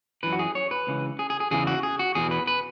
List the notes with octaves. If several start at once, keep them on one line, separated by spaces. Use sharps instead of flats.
F#2 E3 B4
F#4
G#4
C#5
B4
C#2 C#3 E3
G#4
G#4
G#4
E2 C#3 E3 G#4
F#4
G#4
F#4
E2 B2 G#4
B4
B4